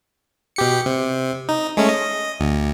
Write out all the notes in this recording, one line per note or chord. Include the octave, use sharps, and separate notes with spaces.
B2 G4 C#7
C3
D#4
G#3 A3 C#4
D#5
D2